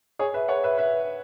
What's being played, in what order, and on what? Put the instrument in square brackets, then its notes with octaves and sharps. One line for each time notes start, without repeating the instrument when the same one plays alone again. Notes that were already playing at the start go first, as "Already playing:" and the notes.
[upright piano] G#4 C#5
B4 E5
C#5 F#5
B4 E5
B4 E5